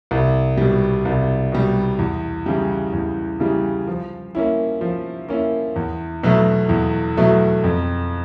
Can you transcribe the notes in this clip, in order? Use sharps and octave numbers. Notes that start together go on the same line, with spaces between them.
C2
B2 G3
C2
B2 G3
E2
C#3 E3 G3
E2
C#3 E3 G3
F3
A#3 C#4 E4
F3
A#3 C#4 E4
E2
B2 F#3 A3
E2
B2 F#3 A3
F2